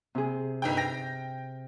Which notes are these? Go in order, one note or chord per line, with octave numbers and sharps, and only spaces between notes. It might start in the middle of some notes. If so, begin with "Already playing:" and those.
C3 G#4
G1 D#4 G5
G5 A#6